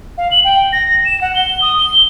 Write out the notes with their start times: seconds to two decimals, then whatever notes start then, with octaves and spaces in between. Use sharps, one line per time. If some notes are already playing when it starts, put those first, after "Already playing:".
0.18 F5
0.31 F#7
0.44 G5
0.73 A#6
1.05 E7
1.21 F#5
1.35 G7
1.62 D#6
1.79 G7